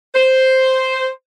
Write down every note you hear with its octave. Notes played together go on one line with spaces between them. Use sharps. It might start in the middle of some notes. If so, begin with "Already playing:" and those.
C5